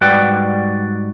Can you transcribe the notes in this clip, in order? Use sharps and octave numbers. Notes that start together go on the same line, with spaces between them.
G#2 G3 F#4 B4 D5 G5